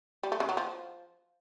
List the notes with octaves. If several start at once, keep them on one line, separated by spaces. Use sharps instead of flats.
G3
A3
C#3
F#3
F3